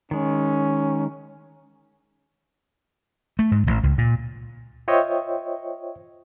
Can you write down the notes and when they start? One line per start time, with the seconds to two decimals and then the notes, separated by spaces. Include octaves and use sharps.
0.11 D#3 G#3 C#4
3.39 A3
3.51 G#2
3.67 A1
3.83 C#2
3.98 A#2
4.88 F4 C5 C#5 D#5 E5 G5